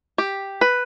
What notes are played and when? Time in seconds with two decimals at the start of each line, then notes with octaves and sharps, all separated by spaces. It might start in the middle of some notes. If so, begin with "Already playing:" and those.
0.18 G4
0.61 B4